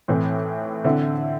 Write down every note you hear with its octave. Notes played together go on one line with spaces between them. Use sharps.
A2 E3 C4
D3 C4 E4